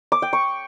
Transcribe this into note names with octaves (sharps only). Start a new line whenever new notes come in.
D6
G5
C#6